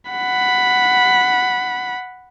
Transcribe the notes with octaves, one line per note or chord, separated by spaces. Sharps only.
F#5 B5